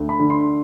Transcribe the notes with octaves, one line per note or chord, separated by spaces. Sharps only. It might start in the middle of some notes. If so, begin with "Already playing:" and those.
Already playing: D2
B5
D3
C6